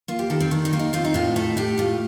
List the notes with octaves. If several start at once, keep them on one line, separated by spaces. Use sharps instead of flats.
A#3 F4
G4
D#3 A4
C4
D#3 D4
D#4
A#3 F4
D#4
C4 F4
D#4
A2 F4
A3 A4
A2 G4
A2 F4